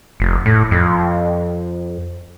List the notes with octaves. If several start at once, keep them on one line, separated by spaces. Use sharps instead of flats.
F1
A2
F2